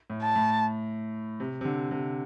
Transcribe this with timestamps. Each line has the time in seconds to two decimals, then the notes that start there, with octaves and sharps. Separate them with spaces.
0.10 A2
0.23 A5
0.36 A2
1.40 C3
1.61 C3
1.65 D3
1.91 C3